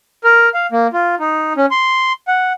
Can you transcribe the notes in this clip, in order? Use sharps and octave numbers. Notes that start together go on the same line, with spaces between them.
A#4
F5
A#3
F4
D#4
C#4
C6
F#5